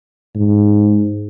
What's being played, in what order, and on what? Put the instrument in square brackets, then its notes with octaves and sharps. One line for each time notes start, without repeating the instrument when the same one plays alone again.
[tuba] G#2